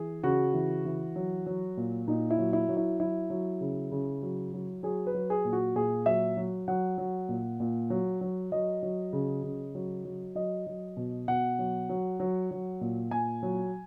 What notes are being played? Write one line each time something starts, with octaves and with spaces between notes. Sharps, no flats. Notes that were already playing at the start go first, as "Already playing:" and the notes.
Already playing: E3 G#4
C#3 F#4
E3
E3
F#3
F#3
A#2
A#2 D#4
E4
F#3
E4
F#3
E4
F#3 E4
F#3
C#3
C#3
F#3
F#3
F#3 G#4
B4
F#3
G#4
A#2
F#4
A#2 G#4
F#3 E5
F#3
F#3 F#5
F#3
A#2
A#2
F#3
F#3
F#3 D#5
F#3
C#3
C#3
F#3
F#3
F#3 D#5
F#3
B2
B2 F#5
F#3
F#3
F#3
F#3
A#2
A#2 G#5
F#3